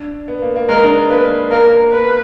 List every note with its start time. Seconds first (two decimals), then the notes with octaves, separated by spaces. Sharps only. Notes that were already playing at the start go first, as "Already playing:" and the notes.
Already playing: D4
0.28 B3
0.42 A#3
0.56 A#3
0.69 G#3 A#4
0.84 D4
0.97 B3
1.10 A#3 B4
1.51 A#3 A#4
1.92 B3 B4